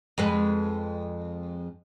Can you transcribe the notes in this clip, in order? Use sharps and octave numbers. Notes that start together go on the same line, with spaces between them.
F2 G#3 B4